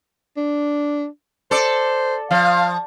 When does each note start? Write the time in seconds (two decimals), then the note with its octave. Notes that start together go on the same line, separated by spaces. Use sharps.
0.37 D4
1.51 A4 C5 D5
2.31 F3 F5